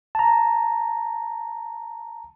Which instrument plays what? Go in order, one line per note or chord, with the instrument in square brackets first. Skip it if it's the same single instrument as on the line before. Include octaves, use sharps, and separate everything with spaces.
[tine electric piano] A5 A#5